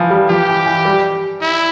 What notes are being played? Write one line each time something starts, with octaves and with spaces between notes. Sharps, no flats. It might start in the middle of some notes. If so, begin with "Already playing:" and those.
Already playing: E3 F3
G3
F3 G4
E3
E3
G3
E4